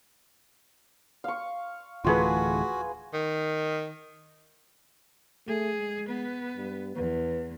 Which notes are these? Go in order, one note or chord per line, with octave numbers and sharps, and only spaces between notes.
F5 C#6
D1 E3 A3 F4 F#4 G#4 B4
D#3
A3 G#4
G#3
B3 B4
G2
E2 B4